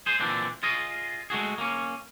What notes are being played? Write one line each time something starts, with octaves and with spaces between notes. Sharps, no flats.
G#4 C5
A#2 D3 E3 C4 D4
F4 G#4 D#5
G#3 A3 F#4 G#4
A#3 C#4